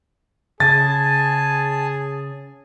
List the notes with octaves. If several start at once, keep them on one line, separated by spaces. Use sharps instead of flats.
C#3 G#4 G#5 A5 A6